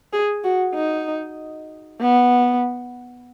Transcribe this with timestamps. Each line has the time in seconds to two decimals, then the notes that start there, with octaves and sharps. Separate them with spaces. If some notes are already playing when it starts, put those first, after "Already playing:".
0.13 G#4
0.44 F#4
0.75 D#4
2.00 B3